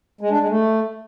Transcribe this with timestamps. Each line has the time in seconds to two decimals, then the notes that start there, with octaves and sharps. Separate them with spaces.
0.21 G#3
0.30 D4
0.39 G#3
0.49 A3